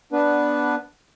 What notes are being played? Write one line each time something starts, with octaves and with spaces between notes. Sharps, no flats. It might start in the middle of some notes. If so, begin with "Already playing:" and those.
B3 D4 B4